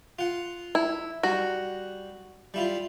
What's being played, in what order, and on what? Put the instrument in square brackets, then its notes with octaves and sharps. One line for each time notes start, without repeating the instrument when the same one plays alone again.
[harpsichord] F4 F#5
[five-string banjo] E4
[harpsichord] G3 [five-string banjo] F#4
[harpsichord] G3 E4 F4